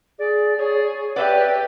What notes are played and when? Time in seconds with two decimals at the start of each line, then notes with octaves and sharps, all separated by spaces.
0.19 G#4 D5
0.59 G#4 C#5
1.16 G4 B4 D5 E5